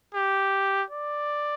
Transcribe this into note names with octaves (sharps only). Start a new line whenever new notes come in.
G4
D5